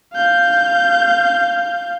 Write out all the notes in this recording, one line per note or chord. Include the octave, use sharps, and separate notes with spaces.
F5 G6